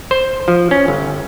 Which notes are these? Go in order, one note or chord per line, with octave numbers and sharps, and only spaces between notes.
C5
F3
C#4
G1